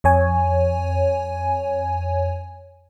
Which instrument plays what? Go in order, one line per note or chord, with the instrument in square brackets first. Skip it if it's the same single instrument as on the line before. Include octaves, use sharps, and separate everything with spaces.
[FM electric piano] F2 C#5 G#5